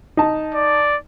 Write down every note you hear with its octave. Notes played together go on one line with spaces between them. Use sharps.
D#4 A5
D5